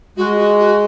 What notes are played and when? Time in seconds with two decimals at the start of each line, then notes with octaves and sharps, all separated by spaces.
0.17 G#3 F#4
0.38 F#4
0.58 F#4